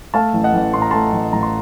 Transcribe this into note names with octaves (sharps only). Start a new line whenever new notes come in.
A3 F5 A5
A1
D#5 F#5
A1
A2 C6
A#5
A3 A5 C6
A1
A1 A#5
C6